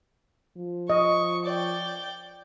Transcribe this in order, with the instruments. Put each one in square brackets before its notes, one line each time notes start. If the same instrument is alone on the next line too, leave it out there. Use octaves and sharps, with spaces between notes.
[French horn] F3
[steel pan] D#5 [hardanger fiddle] C#6
[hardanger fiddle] D5 G5